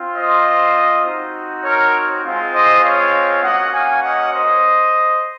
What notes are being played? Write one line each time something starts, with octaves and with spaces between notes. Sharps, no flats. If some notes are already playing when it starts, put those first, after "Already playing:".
Already playing: C4 F4
C5 D#5
C4 D#4 F#4
A#4 C#5
G#3 C4 F4
C5 D#5
C#5 F5
A#3 C#4 F#4 D#5 F#5
F5 G#5
D#5 F#5
C5 D#5